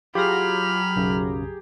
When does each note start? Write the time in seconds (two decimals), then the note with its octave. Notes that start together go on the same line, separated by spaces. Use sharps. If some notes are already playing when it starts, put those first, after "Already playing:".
0.15 F#3 F4 G4 G#4 F5 A#5 B5 F6
0.96 B1 F#2 C#3